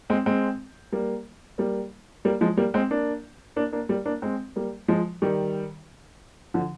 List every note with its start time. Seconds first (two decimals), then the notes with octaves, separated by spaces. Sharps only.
0.10 G#3 C4
0.26 G#3 C4
0.92 G3 A#3
1.58 G3 A#3
2.25 G3 A#3
2.41 F3 G#3
2.57 G3 A#3
2.74 G#3 C4
2.91 A#3 D4
3.56 A#3 D4
3.72 A#3 D4
3.89 G3 A#3
4.06 A#3 D4
4.22 G#3 C4
4.56 G3 A#3
4.88 F3 G#3
5.22 D#3 G3
6.54 D3 F3